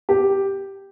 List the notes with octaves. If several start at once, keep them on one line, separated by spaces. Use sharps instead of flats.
G4